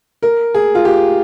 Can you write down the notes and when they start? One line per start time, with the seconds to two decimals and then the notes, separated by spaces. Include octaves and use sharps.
0.23 A#4
0.54 G#4
0.75 F4
0.85 G4